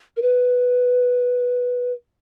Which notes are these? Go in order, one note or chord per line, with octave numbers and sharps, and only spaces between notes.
A#4
B4